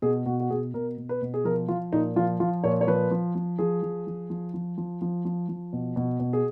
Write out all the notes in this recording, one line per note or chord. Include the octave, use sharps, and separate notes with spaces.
B2 G#4
B2 F#4
F#4
B2 G#4
B2 A#4
B2
B4
B2
G#4
F3 A#4
F3 F4
A#2 D#4
F3 F4
F3 F4
A#2 C#5
C#5
F3 B4
F3
F3
F3 G#4
F3
F3
F3
F3
F3
F3
F3
F3
B2
B2
B2
G#4